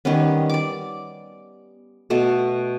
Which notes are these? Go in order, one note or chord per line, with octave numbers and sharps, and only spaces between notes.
D#3 G3 B3 C#4
D5 D6
B2 A3 A4